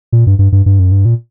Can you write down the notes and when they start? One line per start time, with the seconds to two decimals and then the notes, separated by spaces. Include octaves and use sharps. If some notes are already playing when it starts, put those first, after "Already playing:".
0.12 A#2
0.27 G2
0.39 G2
0.52 G2
0.66 G2
0.79 F#2
0.92 G2
1.05 A#2